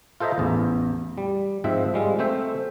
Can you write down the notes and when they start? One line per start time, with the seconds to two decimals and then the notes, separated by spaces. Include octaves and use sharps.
0.20 F4 A4 C5 D#5 E5 A#5
0.38 A1 E2
1.18 G3
1.64 G#2 F3 C4 E5
1.94 G3 G#3 F4
2.19 A3 C4 C5 E5